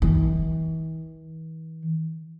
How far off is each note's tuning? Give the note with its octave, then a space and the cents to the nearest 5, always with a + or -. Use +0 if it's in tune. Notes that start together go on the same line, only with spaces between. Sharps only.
E3 -40